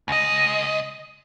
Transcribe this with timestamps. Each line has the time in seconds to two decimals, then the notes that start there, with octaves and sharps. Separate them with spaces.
0.08 C#2 D#5